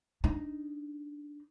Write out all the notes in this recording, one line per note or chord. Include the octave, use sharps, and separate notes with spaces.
D4 D#4